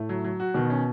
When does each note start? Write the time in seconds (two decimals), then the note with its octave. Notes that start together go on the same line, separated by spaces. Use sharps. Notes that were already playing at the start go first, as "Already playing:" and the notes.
Already playing: A2 A3
0.09 F#3
0.24 F#3
0.40 F#4
0.54 B2 D#3
0.70 C#4